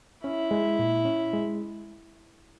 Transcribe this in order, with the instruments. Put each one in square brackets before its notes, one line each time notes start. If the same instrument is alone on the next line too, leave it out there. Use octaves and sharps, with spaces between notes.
[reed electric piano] C#4 [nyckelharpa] E4
[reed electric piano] G#3
A#2
C#4
G#3